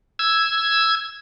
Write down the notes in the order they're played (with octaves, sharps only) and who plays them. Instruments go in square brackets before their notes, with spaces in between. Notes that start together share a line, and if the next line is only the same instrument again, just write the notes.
[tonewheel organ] E6 G#6